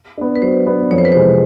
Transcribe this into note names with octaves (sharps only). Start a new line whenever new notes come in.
B3 D4
B4
F#3 C5
B3 D4
F2 C#5
C5
B4
C3 E3 G#3 C5